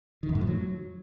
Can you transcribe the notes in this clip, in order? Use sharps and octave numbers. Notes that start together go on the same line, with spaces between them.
D#3
F#2
A2
F3
F#3